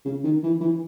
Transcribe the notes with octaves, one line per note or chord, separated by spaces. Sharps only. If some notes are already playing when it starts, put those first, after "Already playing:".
C#3
D#3
E3
E3